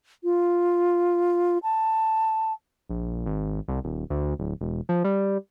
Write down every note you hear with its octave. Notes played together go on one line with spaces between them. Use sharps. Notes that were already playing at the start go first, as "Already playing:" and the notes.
F4
A5
A#1
G#1
C2
D#1
D2
D1
E1
F3
G3